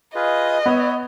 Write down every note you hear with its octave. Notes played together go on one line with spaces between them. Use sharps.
F4 G#4 B4 D#5
B3 C#5 E5